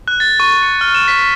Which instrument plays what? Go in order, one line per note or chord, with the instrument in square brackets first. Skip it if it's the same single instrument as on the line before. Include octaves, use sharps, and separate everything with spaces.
[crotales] F#6
A6
C#6
C#7
F6
E7
B6